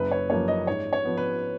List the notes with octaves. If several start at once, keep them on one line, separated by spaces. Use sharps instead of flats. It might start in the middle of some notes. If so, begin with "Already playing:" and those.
Already playing: F#1 B4
C#5
F#2 F3 A#3 C#4 C#5
D#5
G#2 C#5
C#5
F3 B3
B4